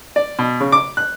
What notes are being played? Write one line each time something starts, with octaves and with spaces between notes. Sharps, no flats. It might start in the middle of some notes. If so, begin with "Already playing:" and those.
D5
B2
C#3
D6
F#6